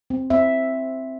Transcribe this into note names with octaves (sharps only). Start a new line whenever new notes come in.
C4
C4 E5